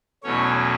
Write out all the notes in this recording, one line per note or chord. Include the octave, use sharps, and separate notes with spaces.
E2 B2 F#3 A3 C#4 C#5